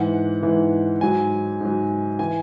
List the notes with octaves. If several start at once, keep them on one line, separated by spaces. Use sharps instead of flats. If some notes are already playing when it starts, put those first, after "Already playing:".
Already playing: G#2 E3 F#5
G#2 E3
G#2 F#3 G#5
G#2 F#3
E3 G#5